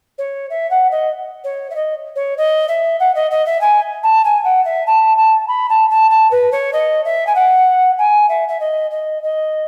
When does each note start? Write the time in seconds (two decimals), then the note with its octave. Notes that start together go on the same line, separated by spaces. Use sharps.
0.18 C#5
0.50 E5
0.71 F#5
0.91 D#5
1.44 C#5
1.70 E5
1.75 D#5
2.16 C#5
2.38 D#5
2.68 E5
3.00 F#5
3.15 D#5
3.31 D#5
3.46 E5
3.61 G#5
4.03 A5
4.25 G#5
4.44 F#5
4.65 E5
4.87 A5
5.17 A5
5.48 B5
5.70 A5
5.90 A5
6.11 A5
6.31 B4
6.52 C#5
6.73 D#5
7.05 E5
7.27 G#5
7.35 F#5
7.98 G#5
8.29 E5
8.49 E5
8.60 D#5
8.91 D#5
9.23 D#5